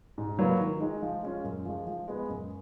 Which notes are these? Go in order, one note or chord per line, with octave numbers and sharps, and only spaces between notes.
G#2
F#3 A#3 F4 B4
D#3
G#3 D#4
F3
G#3 C#4 F4
F#2
F3 G#3
F3
G#3 B3
F#2